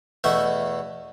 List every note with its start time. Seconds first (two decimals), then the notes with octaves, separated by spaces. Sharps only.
0.24 E2 B2 A3 E5